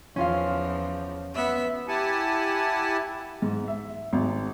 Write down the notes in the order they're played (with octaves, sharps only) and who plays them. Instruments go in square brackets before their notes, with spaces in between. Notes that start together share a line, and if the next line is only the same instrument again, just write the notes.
[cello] E2 F3 [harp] C#4 F4 F5
[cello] B3 E5
[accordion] E4 G4 F#5 G#5 A5
[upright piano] G#2
E5
G#1